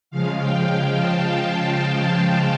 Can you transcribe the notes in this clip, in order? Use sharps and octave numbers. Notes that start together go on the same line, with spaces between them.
C#3 F3 G#3 F5
G5
A5